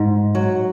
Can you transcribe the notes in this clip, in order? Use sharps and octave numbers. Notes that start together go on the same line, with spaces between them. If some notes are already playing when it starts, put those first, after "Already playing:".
Already playing: G#2
F#3